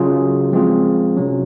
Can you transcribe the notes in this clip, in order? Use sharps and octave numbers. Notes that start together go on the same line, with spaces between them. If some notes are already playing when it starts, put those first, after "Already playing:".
Already playing: C#3 F#3 C#4 F4 G#4
F3 G#3 C4 F4 G#4
C3 F#3 C#4